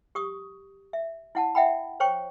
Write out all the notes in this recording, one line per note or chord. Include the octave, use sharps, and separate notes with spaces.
G4 C#6 D#6
E5
E4 F#5 A5
E5 F#5 G5 B5
C5 C#5 G5 C#6